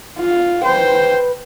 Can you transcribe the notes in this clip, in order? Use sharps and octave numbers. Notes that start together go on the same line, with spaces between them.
F4
B4 C5 G5